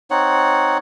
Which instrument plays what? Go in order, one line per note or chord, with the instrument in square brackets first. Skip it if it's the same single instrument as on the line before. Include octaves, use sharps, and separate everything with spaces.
[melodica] C4 D#4 C#5 F#5